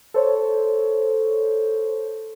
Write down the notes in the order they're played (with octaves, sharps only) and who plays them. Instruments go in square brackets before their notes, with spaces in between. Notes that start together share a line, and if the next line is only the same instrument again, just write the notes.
[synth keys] A4 C5 C#5